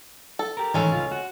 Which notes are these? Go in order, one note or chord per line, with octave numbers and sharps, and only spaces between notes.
A4
G4 A#4
A2 D#3 E3 G#3 C#4 A4
C#2 F4
F#4